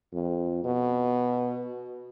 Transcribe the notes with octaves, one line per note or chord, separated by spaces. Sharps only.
F2
B2